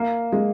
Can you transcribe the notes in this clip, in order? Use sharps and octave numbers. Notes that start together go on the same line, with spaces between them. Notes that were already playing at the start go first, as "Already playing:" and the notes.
Already playing: A#3
G#3